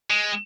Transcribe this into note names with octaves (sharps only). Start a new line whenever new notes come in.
G#3